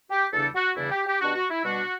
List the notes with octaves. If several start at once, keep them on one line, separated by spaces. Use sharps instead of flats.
G4
E2 C#3 G3 D4 A4
F#4
E2 C#3 G3 D4 E4
G4
G4
B2 G3 D4 F#4
F#4
E4
B2 G3 D4 F#4